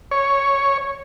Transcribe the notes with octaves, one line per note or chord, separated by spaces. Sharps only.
C#5